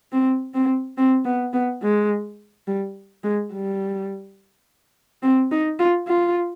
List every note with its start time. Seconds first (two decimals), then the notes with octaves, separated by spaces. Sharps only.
0.12 C4
0.54 C4
0.97 C4
1.25 B3
1.53 B3
1.82 G#3
2.67 G3
3.24 G#3
3.53 G3
5.23 C4
5.51 D#4
5.79 F4
6.07 F4